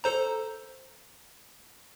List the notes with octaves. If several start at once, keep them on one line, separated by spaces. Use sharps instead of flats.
A4 C5 A#5